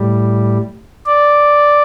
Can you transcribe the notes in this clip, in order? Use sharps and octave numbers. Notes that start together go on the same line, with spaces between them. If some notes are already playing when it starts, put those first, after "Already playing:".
Already playing: A2 G3
D5